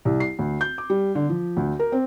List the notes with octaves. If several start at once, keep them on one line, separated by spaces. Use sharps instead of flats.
C2
C7
D2
G6
D6
G3
D3
F3
D2
A#4
C4